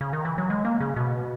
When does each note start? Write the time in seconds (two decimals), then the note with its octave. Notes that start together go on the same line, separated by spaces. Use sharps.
0.01 C#3
0.13 D#3
0.25 E3
0.38 F#3
0.50 G#3
0.65 A#3
0.80 C#3
0.96 B2